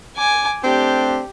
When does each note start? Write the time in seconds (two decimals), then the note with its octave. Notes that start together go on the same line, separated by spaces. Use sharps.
0.17 G#5 D6
0.64 A3 C4 D4 G4